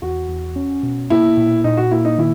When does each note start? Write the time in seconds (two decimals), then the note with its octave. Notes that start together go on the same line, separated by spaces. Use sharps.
0.02 E2 F#4
0.29 E2
0.56 C#4
0.83 B2
1.10 A#3 E4
1.37 A#2
1.64 A#2 D#4
1.77 F#4
1.91 A#3 E4
2.05 D#4
2.18 D#3 E4